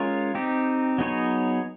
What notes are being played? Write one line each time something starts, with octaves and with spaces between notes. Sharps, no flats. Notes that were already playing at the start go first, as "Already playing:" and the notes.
Already playing: G#3 C#4 F4 A#4 C#5
C4 D#4 G4
F#3 B3 D#4 G#4 C#5